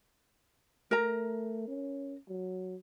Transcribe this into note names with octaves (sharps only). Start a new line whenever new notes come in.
A3 A#4 A#5
C#4
F#3